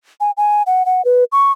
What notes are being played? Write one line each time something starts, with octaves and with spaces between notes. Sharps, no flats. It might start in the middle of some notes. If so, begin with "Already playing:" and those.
G#5
G#5
F#5
F#5
B4
C#6